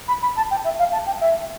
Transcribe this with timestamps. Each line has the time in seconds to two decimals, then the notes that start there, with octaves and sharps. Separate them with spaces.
0.08 B5
0.22 B5
0.36 A5
0.51 G5
0.64 E5
0.79 F5
0.92 A5
1.06 G5
1.21 E5